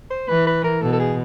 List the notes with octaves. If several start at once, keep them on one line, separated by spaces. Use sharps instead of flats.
C5
E3 B4
B4
A#4
B2 A4
A4
G#4